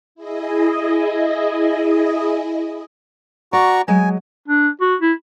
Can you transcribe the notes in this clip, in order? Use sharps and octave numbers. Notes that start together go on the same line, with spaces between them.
E4 G#4 D#5
F#4 D5 A#5 C#6
F#3 G#3 D#5 G#5
D4
F#4
E4